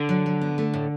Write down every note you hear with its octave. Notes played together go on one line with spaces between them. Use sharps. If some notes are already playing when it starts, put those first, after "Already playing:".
Already playing: D3
F#3
F#3
B3
A3
A2